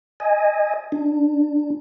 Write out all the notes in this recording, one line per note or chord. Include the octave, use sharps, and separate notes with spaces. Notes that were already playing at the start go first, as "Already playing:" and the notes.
D#5 G#5
D4